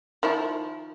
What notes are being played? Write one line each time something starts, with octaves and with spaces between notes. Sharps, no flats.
D#3 F3 E4